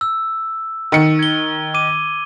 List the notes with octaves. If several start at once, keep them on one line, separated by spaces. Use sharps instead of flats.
E6
D#3 C#7
G#6 G7
D6 D#7